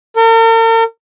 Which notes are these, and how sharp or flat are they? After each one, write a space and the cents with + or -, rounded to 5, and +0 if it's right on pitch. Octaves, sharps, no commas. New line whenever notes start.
A#4 -45